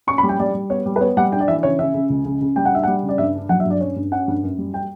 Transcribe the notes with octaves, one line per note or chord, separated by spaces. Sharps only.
C#4 C#6
B5
G3
G5
G3 D5
G3
B3 C#5
G3
B4
B3 C#5
G3 F#5
D4 G5
D5
E3 E5
C#3 C#5
C#3 E5
C#3
C#2
C#3
C#3
G3 G5
F#5
D4 E5
G3 F#5
C#3
D5
G2 E5
D4
F#3 F#5
E5
G2
D5
C#4 C#5
G2
C#4 F#5
G2
F#2
G3
G5